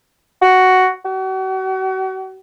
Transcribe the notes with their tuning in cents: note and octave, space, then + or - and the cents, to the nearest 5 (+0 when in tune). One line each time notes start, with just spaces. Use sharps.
F#4 +5
F#4 +40